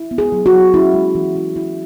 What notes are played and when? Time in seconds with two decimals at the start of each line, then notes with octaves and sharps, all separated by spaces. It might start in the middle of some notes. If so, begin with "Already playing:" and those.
Already playing: E4
0.11 B3
0.18 G#4
0.32 F#3
0.46 F#4
0.53 F#3
0.74 C#4 E4
0.94 G#3
1.15 E3
1.36 E4
1.56 E4